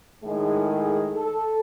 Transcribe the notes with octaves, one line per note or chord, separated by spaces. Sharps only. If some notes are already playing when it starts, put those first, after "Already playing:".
A2 D#3 G#3 G#4
A4